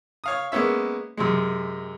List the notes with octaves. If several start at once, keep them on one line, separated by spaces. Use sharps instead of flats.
C#5 F5 D#6
G#3 A#3 B3 C#4 E5
F#2 C3 G#3